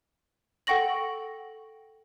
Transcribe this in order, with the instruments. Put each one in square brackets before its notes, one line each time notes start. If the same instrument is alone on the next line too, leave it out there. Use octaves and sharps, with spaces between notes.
[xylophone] A4 F#5 G5 C#6 A#6 F#7